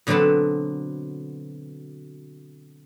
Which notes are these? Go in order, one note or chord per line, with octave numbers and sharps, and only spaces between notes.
B2 D3 F#3 C4 B4 A5